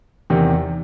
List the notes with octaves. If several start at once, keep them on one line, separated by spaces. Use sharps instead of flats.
E2 C3 D#3